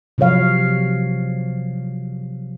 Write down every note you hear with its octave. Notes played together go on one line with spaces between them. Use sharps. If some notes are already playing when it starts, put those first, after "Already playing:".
C3 F3 F#3 C#5 F5